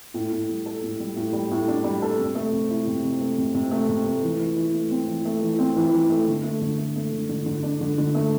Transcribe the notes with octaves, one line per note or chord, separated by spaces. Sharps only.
A2
A2
G3
A4
A2
G3
A2
G3
A2
D4
G3
A4
C3
A3
C3
E4
C3
C3
A3
C3
C3
A3
C3
A3
E3
E3
E3
A3
C4
E3
A3
E3
C4
E3
E3
A3
D3
A3
D3
A3
A3
D3
D3
D3
D4
D3
D3
A3